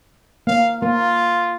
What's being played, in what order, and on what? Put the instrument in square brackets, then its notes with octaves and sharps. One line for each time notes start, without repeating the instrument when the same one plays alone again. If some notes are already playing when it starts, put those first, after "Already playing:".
[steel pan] A#3 [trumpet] F5
[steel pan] A#3 [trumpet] F4